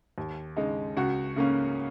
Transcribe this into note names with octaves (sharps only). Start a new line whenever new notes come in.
D#2
C#3 G#3 D#4
C#2 F#4
C#3 A#3 C#4